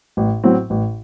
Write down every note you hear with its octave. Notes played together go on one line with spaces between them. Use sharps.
A1
A2 F#3 C4
A1